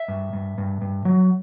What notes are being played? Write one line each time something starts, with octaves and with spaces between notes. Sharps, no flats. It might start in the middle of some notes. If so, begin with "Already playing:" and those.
Already playing: E5
G2
G2
G2
G2
F#3